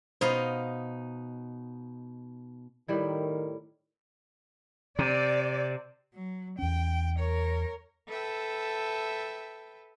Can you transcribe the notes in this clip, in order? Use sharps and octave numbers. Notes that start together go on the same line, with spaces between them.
B2 D#4 C5 F5
A2 D#3 G3 E4
C3 D5
F#3
E2 C#4 G5
A#4 C#5
A4 B4 E5 G5 A5